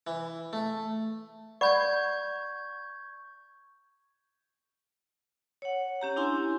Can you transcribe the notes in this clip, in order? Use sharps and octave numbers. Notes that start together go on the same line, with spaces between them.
E3
A3
D5 F#5 B5 C#6 G6 G#6
C#5 F#5
C#4 G4 A#5
D4 E4 G4 G#5 C6